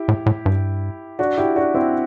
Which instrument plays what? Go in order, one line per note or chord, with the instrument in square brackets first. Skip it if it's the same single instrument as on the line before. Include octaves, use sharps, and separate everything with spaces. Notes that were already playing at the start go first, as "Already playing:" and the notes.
Already playing: [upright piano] E4 G4
[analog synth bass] A2
A2
G2
[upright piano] D4 F#4
E4 G4
D4 F#4
C4 E4